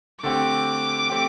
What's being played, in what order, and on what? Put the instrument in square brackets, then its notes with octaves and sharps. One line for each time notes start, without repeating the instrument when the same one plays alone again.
[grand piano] D3 A3 C4 G4 [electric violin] D6
[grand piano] A3 C4 G4